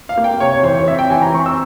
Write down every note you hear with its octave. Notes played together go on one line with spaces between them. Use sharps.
F5
A#3
G5
C3 C#5
C#5
E3 C5
C#5
C4 E5
G5
E3 G#5
A#5
C4 C#6
E6